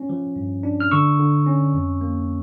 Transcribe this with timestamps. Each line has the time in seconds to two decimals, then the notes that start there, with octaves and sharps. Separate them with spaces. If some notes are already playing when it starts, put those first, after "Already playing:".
Already playing: C#4
0.09 F3
0.36 G2
0.63 D4
0.80 F6
0.91 D3 C#6 E6
1.19 D3
1.47 C#4
1.74 F2
2.01 A#3